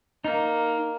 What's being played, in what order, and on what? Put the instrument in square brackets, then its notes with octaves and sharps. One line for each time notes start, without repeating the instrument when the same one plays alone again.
[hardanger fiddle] A#3 [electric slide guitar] D#4